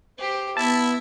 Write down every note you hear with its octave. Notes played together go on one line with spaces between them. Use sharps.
G4 C5
B3 E4 E5 A5